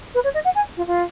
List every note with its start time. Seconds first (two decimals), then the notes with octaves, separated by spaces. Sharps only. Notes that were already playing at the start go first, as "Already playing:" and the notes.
0.15 B4
0.24 C#5
0.34 D#5
0.45 F#5
0.55 G#5
0.77 F4
0.87 F4